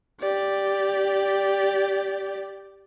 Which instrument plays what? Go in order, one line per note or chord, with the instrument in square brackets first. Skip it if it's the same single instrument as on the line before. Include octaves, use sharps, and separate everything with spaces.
[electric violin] G4 D5